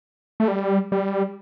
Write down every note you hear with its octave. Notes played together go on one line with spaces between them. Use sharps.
A3
G3
G3